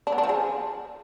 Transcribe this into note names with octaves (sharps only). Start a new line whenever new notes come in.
D4
B3
D4
F3
G#4